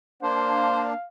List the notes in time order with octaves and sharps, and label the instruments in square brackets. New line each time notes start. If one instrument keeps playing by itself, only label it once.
[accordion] A#3 D4 [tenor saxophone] C5 [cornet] F5